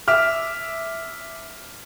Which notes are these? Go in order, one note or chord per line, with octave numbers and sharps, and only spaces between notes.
E5 D6 F6